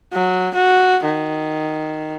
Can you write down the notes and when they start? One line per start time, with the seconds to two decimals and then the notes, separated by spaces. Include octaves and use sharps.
0.14 F#3
0.55 F#4
1.04 D#3